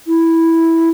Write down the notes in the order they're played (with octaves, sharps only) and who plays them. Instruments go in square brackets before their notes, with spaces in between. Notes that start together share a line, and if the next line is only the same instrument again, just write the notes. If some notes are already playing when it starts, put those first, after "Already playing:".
[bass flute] E4